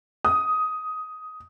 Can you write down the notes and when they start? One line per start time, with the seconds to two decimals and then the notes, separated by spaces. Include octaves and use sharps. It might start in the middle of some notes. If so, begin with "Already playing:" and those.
0.25 D#6